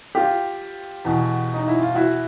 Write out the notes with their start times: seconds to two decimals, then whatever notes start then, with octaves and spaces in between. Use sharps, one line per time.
0.15 F4 G4
1.05 E2 B2
1.54 D#4
1.68 E4
1.81 F4
1.95 E4 F#4